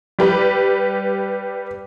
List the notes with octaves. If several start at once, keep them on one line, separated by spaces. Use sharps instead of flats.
G3 G4 B4